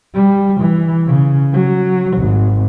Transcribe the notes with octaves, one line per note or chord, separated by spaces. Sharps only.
G3
E3
C#3
F#3
G#1